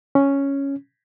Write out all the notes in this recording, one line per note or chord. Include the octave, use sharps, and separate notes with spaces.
C#4